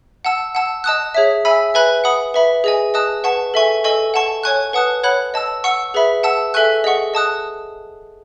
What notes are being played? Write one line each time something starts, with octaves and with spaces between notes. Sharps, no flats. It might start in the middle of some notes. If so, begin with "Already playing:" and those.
F#5 A5 E6
F#5 A5 E6
D#5 A5 D#6 F#6
G#4 C#5 E5
E5 G#5 B5 E6
B4 E5 G#5 B5 F#6
F#5 B5 D#6
B4 E5 B5
G#4 D#5 G#5
D#5 A5 D#6 F#6
B4 F#5 A5 C#6
A4 E5 G#5 C#6
A4 D#5 G#5 C#6 E6
F#5 A5 C#6
C#5 G#5 C#6 F#6
B4 F#5 A5 D#6 F#6
C#5 F#5 B5 F#6
D#5 A5 E6
F#5 C#6 E6
G#4 B4 E5 B5
F#5 A5 E6
A4 E5 G#5 C#6 F#6
G#4 D#5 F#5 C#6
D#5 A5 D#6 F#6